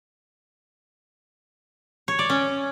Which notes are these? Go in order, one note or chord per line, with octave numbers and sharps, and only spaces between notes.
C#5
D5
C#4